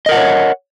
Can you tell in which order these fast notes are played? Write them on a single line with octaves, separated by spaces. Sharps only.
D#5 A#4 F#5 B4 C#5